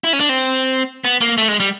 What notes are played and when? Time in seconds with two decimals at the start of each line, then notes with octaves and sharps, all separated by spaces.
0.04 E4
0.13 C#4
0.20 D4
0.29 C4
1.04 B3
1.21 A#3
1.38 A3
1.48 G#3
1.60 G3